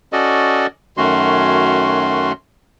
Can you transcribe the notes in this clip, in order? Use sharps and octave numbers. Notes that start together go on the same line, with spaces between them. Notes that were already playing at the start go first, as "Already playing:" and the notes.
C#4 F#4 A4 D5 D#5
F#2 D#3 A3 C#4 F#4 C6